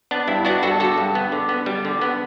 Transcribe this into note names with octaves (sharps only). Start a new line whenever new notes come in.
B3 D4
G2 E4
B3 D4 F#4
G2 F#4 A4
D3 F#4 A4
G2
B3
D3
B3
G3
D3
B3